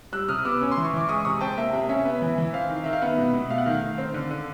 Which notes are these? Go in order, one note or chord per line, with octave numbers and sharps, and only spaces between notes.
G3 E6 F#6
C3 D#6 F6
B3 D6 E6
C#4
C6
E3
C#6
E3 D6
G#3 C#6 D#6
C3 C#6 D#6
C4 G5 A5
A#3 E5
C3 E5
C#4 E5
B3
E3
E3
C4 F5
D#3
D#3 E5
F5
B3 E5 F#5
B2
B2
A3 F5
F#5
D#3 F5
D#3
C4
D3
D3